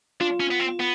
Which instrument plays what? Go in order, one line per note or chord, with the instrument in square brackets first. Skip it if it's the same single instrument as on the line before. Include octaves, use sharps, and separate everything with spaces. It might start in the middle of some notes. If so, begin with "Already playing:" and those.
[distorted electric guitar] D4 [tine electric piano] F4
[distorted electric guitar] C#4
B3
C4
B3